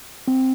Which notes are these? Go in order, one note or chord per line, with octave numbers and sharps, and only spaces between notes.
C4